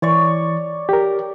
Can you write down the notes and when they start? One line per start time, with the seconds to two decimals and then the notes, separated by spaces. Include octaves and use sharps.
0.02 E3 C#5 D5 C#6
0.89 G4 A#4